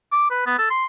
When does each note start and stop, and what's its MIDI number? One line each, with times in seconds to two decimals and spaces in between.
0.12 0.28 86
0.31 0.45 71
0.46 0.54 59
0.58 0.66 69
0.71 0.85 84